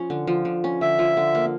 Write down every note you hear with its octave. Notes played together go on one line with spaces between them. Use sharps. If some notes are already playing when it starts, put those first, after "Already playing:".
Already playing: F3 C#4
D3
F3
D3
C#4
D3 E5
F3
D3
A#3